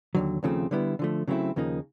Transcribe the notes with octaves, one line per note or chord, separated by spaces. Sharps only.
D#2 D3 F#3
D#2 C#3 F3 A3 C4
D3 G3 B3 E4
D3 F3 A3
C#3 F#3 A3 C4 E4
D#2 C#3 F3 A#3 D#4